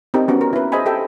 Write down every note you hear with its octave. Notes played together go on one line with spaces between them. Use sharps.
C4 D4 D#4 G4 A#4
B3 C#4 F#4
A#4
E4 B4
G#4 C5 D#5 E5 G#5 B5
G4 A4 E5 G5